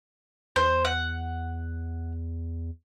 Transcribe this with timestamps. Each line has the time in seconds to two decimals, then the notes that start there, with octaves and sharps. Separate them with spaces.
0.56 E2 C5
0.85 F#5